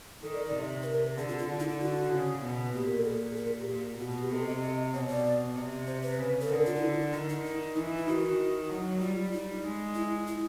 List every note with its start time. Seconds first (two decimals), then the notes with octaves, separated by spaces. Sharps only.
0.23 D#3 A4
0.34 D5
0.45 D5
0.55 C3
0.83 B4
0.86 A#4
1.18 D3 G#4
1.28 F4
1.39 F4
1.49 D3
1.60 D#4
1.70 E4
1.80 F#4
2.12 C#3
2.42 B2
2.74 A#2 G4
2.87 A#4
2.97 A4
3.05 G#4
3.37 A#4
3.48 G#4
3.58 G4
3.68 A#2
3.99 B2 F#4
4.10 F#4
4.21 G4
4.31 C3 A4
4.46 D#5
4.62 D#5
4.94 B2 C#5
5.09 D5
5.56 C3
5.87 C5
6.03 B4
6.19 C#3
6.41 A4
6.50 D3 A#4
6.66 F4
6.76 D#4
6.82 E4
7.13 D#3 D#4
7.29 D#4
7.45 D#4
7.75 E3 D#4
7.86 E4
7.97 E4
8.07 D#3 F#4
8.70 F#3
9.01 G3 F4
9.33 D#4
9.64 G#3
9.95 E4
10.27 E4